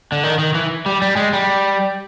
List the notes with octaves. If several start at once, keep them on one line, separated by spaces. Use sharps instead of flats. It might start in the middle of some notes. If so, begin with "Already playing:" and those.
D3
D#3
D#3
E3
G3
G3
G#3
G3